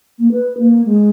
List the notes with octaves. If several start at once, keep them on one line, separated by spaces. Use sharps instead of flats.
A#3
B4
A#3
G#3